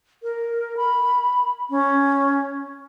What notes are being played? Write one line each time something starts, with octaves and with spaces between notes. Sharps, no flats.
A#4
B5
C#4